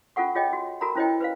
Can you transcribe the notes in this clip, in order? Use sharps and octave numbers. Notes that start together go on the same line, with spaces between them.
C#4 F4 A4 F#5 C#6
F4 G#4 C#5 D#5 G5
F#4
F#4 A4 A#4 A#5 B5
C#4 E4 C5 C#5 D#5 G5
B4 C5 F5